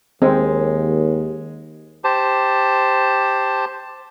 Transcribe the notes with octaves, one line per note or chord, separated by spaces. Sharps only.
D#2 G#3 C4
G4 C5 A5